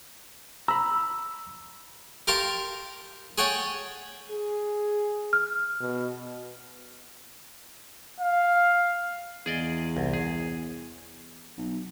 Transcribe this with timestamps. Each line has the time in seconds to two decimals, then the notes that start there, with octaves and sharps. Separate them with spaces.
0.68 A#5 B5 E6
2.27 G4 A#4 F5 A5 C6
3.38 G#4 C#5 F#5 G5 A5
4.31 G#4
5.33 F6
5.80 B2
8.20 F5
9.46 E2 G#4 D5 D#5
9.97 C2
10.14 G#4
11.58 B1